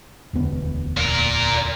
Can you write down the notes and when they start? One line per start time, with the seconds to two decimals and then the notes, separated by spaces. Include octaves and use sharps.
0.33 E1 D2 B3
0.97 A#2 A#4